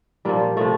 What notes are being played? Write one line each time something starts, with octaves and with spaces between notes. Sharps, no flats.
A#2 F3 G3 A#3
C3 F3 A3